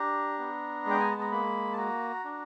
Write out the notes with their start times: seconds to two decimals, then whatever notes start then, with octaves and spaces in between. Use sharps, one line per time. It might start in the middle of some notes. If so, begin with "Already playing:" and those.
Already playing: D4 G4 A#5
0.39 B3
0.85 G#3 G5
1.00 G#5
1.12 A5
1.21 A#5
1.32 A#3 B5
1.73 A5
1.78 F#4 A#5
2.24 D4